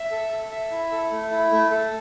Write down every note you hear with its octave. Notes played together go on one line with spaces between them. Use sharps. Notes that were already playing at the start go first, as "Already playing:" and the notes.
Already playing: E5
A4
A4
E5
E4
A4
A3
E4
A3
A4